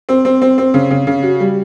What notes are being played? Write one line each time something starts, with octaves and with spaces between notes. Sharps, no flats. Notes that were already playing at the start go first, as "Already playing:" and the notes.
C4
C4
C4
C4
C#3
C#3
C#3
F#4
G3